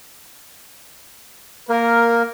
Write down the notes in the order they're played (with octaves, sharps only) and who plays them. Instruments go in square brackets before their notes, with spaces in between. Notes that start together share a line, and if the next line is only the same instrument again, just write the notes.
[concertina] A#3 [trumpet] A#4